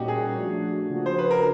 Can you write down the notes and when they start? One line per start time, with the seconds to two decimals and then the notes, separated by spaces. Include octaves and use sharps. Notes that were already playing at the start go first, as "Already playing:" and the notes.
Already playing: A#2 G3 A#3 C#4 D#4 F#4 G4
0.08 G#4
0.36 F3 A3 D4 F#4
0.90 C#3 F3 A#3 D4 F#4
1.06 C5
1.18 B4
1.31 A#4